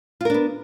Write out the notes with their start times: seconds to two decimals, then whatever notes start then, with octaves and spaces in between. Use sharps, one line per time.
0.21 F4
0.25 A#4
0.30 D4
0.34 B3